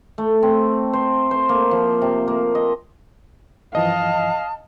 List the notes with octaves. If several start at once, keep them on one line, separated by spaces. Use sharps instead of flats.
A3
C4
C5
C5
A#3
F3
C3
A#3
D#5
G2 E3 F3 D#5 F5 A5